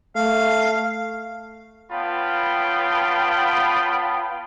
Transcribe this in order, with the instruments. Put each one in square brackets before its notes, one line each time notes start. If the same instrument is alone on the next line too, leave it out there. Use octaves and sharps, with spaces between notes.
[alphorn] A3 [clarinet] F5
[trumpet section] B3 F4 C#5 G5 A5 B5